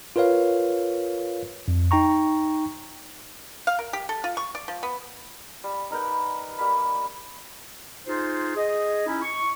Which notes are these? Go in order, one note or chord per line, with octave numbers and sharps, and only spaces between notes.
F4 A#4 B4 C#5 F5
F2
D#4 G5 A#5 C#6
F5
A#4
G4
A4
F4
C#6
D5
F3
B3
G3
D#4 A#4 B4 G5
G3 A#3 B5
D#4 F4 G#4 C5
G#4 D#5
C#4 D#4 E4
C#6